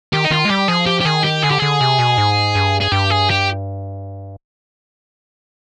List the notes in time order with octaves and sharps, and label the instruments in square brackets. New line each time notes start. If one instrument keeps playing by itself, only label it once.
[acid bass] D#3 [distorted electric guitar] G4
[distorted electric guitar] D#4
[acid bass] D#3 [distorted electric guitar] F4
[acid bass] G#3
[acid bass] G3 [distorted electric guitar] G4
[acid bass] F3 [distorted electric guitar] G#4
[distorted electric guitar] G4
G4
[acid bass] D#3 [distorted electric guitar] G#4
[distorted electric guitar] G4
[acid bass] D3 [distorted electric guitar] G#4
[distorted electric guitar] G4
[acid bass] D3 [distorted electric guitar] G#4
[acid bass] C3
B2
G#2
G2
[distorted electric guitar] G#4
[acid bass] G2 [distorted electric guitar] G4
[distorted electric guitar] G#4
G4